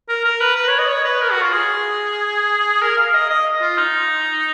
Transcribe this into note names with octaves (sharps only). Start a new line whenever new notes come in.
A#4
A#4
B4
B4
C#5
D#5
C#5
B4
A#4
F#4
F4
G#4
A#4
F5
D#5
D#5
F4
D#4